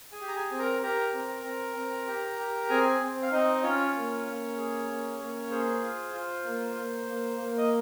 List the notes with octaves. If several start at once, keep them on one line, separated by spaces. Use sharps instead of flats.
G#4 G#5
G4
A#5
G#4 G#5
C4
A#4 A#5
G4 A#4 A#5
C4
C4
C4
G4
G4
C4 G#4 G#5
C4
F5
C4 D#4 D#5
C#4 F4 C#5
A#3
A#3
G#4
A#3
A#3
G#4 C5
F4
F4
A#3
A#3
A#3
A#3
D#5